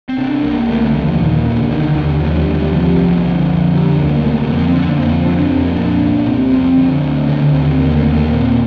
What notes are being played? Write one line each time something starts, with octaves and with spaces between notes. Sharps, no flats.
C4
C3 D4
C2 A#3
D3 A3
D#2 F3
A#2 D#3
C2 D3
D3 D#3
D#2 D3
D3 F3
G3
D#2
G3
C3 F3
C2 F3
D3
F2
D3 G3
D2 A#3
C3 A3
A#3
F2
C4
C4
D3 D4
A#3
F2 C4
C3 D4
D4
F2 C4
A#3
A#2 D4
C2
C3 C4
F2 C4
D3
D2
D3 C4
D#2 C4
D3 A#3
A3
D#2
A#3
A#2 C4